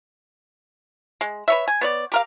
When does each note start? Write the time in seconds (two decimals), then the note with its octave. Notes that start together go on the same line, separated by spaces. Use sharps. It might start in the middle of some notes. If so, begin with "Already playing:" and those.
1.21 G#3
1.48 B4 C#5 E5
1.68 G#5
1.81 B3 C#5 D5
2.12 G4 A#4 F5